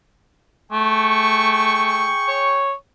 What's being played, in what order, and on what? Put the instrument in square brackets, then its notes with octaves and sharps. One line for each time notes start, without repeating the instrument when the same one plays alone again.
[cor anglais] A3 [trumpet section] G#4 G5 C#6
[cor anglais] C#5